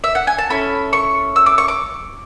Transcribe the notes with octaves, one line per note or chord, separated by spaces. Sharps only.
E5
F#5
G#5
A5
C#4 E4 A4 B5
C#6
E6
D6
C#6
D6